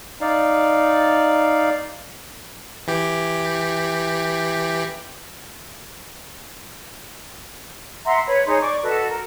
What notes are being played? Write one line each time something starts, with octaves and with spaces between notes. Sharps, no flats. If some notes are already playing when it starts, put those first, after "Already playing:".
D#4 D5 F5
E3 G4
E5 F#5 A#5 C6
B4 C#5 B5
D#4 G#4 C5 C#5
D5 C#6 D6
F#4 A4 B4 D#5
A#4